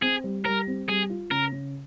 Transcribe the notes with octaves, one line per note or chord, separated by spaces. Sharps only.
C4 G#4
G3
G3 A#4
C4
G3 G#4
F4
C#3 A#4
C#3